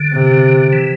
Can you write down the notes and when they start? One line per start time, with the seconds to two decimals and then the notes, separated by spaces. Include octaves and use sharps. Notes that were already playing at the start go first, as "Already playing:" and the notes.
Already playing: D3
0.12 C3
0.73 E3